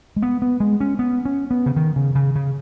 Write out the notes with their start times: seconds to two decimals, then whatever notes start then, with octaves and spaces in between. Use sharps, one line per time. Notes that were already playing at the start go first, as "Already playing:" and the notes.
0.16 G#3
0.23 B3
0.42 B3
0.60 G#3
0.80 C#4
0.99 B3
1.25 C#4
1.51 B3
1.66 C#3
1.76 D#3
1.96 C#3
2.15 C#3
2.36 C#3